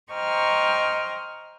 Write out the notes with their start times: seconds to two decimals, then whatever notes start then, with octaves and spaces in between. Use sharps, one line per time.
0.12 C5 D#5 G5 A#5 C#6 F6